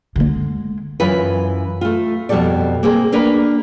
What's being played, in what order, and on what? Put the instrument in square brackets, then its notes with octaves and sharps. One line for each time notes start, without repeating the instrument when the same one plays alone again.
[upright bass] D3 G#3
[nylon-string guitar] F#2 E3 F4 B4
A3 F4
F2 B2 D#3 G3 A4 D5
A#3 C4 G#4
A#3 D4 A#4 B4